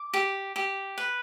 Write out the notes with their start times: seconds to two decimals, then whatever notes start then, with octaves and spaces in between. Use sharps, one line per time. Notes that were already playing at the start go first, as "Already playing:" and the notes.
Already playing: D6
0.14 G4
0.56 G4
0.98 B4